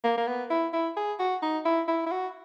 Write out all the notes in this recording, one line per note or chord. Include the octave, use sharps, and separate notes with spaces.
A#3
A#3
B3
E4
E4
G#4
F#4
D#4
E4
E4
E4
F#4